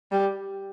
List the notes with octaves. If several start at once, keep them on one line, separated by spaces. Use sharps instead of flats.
G3